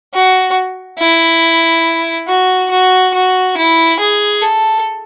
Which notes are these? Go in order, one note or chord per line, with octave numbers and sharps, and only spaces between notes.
F#4
E4
F#4
F#4
F#4
E4
G#4
A4